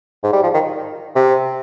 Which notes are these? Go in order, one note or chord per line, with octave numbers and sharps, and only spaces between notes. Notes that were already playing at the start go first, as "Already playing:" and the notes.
G#2
G3
F3
D#3
C3